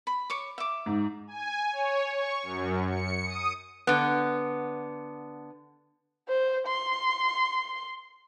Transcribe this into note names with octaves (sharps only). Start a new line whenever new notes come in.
B5
C#5 C#6 D6
E5 D6
G#2
G#5
C#5
C#6
F#2
C#7
D#6
D3 B3
C5
C6